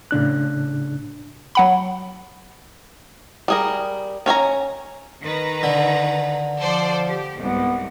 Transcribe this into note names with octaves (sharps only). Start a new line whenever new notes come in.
A2 C#3 D4 F#6
F#3 F#5 B5
G3 G#4 A#4
C#4 C#5 G#5 A#5
D#3 B4 A#5
D3
F3 A4 C5 D5
G4
C2 G#2 B3